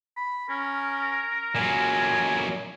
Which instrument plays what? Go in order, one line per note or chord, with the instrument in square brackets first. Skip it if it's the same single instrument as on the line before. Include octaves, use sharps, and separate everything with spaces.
[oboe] B5
[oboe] C#4 [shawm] A#4
[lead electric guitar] A#2 F#3 [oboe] G#5